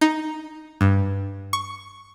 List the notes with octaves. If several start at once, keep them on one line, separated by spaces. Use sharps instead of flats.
D#4
G2
C#6